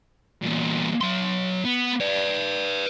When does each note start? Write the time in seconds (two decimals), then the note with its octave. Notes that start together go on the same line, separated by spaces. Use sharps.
0.42 E2 A#2
1.01 F#3 C6
1.65 B3
2.01 B4 D5